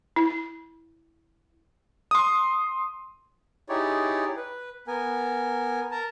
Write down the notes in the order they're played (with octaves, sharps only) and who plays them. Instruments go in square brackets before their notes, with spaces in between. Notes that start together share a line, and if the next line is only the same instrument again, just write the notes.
[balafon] E4
[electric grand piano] C6 D#6
[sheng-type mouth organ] D#4 E4 G4 G#4 C#5 D5
B4
B3 A#4 G#5
A#4 A5 A#5